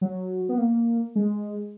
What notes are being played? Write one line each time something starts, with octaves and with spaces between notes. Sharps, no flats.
F#3
B3
A#3
G#3